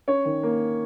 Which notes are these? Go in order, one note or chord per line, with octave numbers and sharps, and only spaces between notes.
C#4 C#5
D#3
A#3